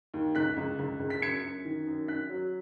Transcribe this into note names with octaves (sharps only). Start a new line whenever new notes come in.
D#2
C#2 F#6 B6
C#2
C#2
C#2
B6
F#2 G#6 C#7
F#2
D#3
F#2
F#2 F#6 B6
F#3